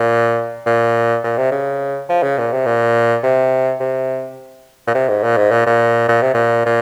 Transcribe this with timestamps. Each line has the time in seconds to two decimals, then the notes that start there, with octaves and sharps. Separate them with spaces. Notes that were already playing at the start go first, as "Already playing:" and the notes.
Already playing: A#2
0.66 A#2
1.24 A#2
1.38 C3
1.51 C#3
2.09 F3
2.23 C#3
2.38 A#2
2.52 C3
2.66 A#2
3.23 C3
3.80 C3
4.87 A#2
4.94 C3
5.09 G#2
5.23 A#2
5.37 G#2
5.51 A#2
5.66 A#2
6.08 A#2
6.22 C3
6.34 A#2
6.66 A#2